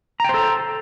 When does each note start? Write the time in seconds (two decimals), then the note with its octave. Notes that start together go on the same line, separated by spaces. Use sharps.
0.20 A#5
0.24 G5
0.29 C5
0.34 A4